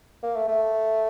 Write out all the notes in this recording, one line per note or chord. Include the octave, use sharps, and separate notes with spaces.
A#3
A3
A3